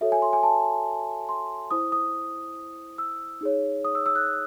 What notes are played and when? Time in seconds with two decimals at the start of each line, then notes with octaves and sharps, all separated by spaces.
0.01 F#4 A4 C#5 E5
0.12 G#5
0.22 C6
0.33 G#5
0.43 A5
1.29 C6
1.71 E4 C5 D#6
1.92 D#6
2.98 E6
3.41 D#4 G#4 C#5
3.85 D#6
3.95 E6
4.06 E6
4.15 F#6